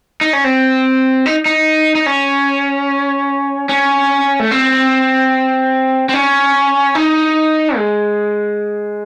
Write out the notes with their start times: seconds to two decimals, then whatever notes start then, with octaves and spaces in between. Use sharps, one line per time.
0.21 D#4
0.33 C#4
0.44 C4
1.26 D#4
1.46 D#4
1.95 D#4
2.06 C#4
3.69 C#4
4.40 A3
4.51 C4
6.09 C4
6.14 C#4
6.95 D#4
7.76 G#3